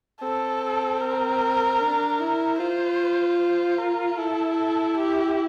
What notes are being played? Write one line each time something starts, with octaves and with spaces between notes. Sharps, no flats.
C4 A4
A#4
D4
E4
F4 C5
C5
A#4
E4 A4
A4
G4